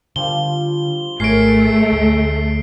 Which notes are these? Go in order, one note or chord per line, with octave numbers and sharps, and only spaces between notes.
D3 F3 G3 G7
G#1 A3 G#4 A#4 C#5 C7 D7
D2